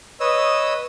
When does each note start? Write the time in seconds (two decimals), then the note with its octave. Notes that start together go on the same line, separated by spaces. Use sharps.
0.20 B4 C#5 D#5 D#6 E6